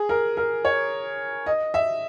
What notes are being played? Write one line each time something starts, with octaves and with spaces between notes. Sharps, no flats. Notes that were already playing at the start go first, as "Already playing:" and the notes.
Already playing: G#4
A#4
A#4
C#5
D#5
E5